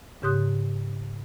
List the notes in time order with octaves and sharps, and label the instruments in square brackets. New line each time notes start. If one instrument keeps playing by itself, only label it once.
[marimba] G#2 C#3 G4 C6 D#6 F#6